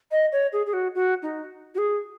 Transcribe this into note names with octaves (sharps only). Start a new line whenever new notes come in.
D#5
C#5
G#4
G#4
F#4
F#4
D#4
F#4
G#4